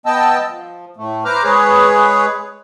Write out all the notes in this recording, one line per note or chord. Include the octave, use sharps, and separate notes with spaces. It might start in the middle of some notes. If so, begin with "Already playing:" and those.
B3 D#5 G5 A5 E6
F3
A2 A3
B4 C5 A#5 D6 F6
G#3 G#4 B4 C#5